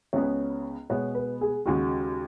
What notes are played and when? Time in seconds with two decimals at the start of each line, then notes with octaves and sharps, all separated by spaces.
0.13 C#2 C#3 B3 G#4 C#5
0.90 B2 G#3 B3 C#5
1.15 B4
1.41 G#4
1.66 D#2 C#3 G#3 F#4